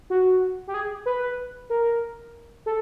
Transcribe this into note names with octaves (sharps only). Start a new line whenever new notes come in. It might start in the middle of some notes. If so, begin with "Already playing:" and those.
F#4
G4
G#4
B4
A#4
A4